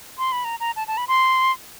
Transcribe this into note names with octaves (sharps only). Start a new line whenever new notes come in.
C6
B5
A#5
A#5
A5
A5
B5
C6